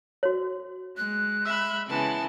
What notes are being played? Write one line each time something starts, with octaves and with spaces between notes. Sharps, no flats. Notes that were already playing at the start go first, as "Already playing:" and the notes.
F#4 C#5
G#3 F#6
E5 B5 E6
C#3 E3 G#3 B3 A5